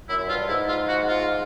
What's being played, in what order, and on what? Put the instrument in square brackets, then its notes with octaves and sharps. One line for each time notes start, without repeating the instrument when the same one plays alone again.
[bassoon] F#2 [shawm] E4
[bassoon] G2 [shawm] F4
[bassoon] G#2 [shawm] E4
[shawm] F4
F#4
F4